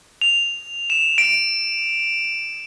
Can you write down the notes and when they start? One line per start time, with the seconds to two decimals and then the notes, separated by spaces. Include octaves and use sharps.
0.21 F7
0.90 E7
1.18 D7